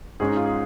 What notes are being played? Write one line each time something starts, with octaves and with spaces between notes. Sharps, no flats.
G#2 G#3 C#4 G#4
D#4
F4
G#4